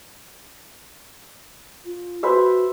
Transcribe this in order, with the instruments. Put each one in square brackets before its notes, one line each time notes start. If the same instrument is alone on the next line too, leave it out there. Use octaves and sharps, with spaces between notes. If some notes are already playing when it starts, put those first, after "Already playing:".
[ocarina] F4
[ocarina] F#4 [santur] B4 C5 E5